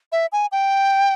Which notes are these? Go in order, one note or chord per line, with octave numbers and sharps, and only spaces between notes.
E5
G#5
G5